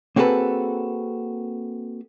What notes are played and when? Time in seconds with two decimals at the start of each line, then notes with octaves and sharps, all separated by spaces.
0.16 A#3 C4 F#4 G#4 A4 B4